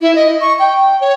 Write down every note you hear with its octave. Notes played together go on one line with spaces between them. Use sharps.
E4
D#5
C#6
G5
C#5